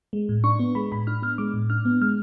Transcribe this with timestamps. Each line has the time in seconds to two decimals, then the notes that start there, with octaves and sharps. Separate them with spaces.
0.13 G#3
0.29 A2
0.44 D4 C#6
0.59 B3
0.75 G#3 B5
0.92 A2 B5
1.07 D4 F6
1.22 B3 F6
1.38 G#3 D6
1.53 A2
1.70 D4 F6
1.85 B3
2.01 G#3 F6